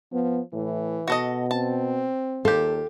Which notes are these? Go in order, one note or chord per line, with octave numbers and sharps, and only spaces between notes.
F3 B3
A2 E3
B2 F#4 A4 D#5
C4 A5
D#2 F4 G4 A4